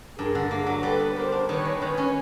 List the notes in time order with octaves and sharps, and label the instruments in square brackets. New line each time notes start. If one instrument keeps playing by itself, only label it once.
[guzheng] G2 [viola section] G#4 A#4
[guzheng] D3
[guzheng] A#3 [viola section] G#4 A#4
[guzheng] F#3
[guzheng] G3 [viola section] A4 B4
[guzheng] B3
[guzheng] G4 [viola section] A#4 C5
[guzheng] D4
[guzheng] D#3 [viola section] B4 C#5
[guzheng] G#3
[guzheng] D#3 [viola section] B4 C#5
[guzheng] C#4